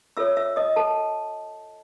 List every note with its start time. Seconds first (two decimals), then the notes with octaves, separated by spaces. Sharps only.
0.17 F4 A4 C#5 E5 E6
0.37 E5 E6
0.56 D#5 D#6
0.76 A4 A5